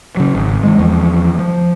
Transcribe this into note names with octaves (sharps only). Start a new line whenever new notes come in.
C#3 F#3
G#1
E3 G3 G#3
E2 F3
F3